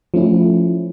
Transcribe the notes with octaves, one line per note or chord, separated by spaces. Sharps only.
F3 A3 C#4 E4